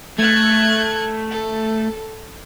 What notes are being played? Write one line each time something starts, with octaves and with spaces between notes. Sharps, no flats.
A3 F#6 G#6
A4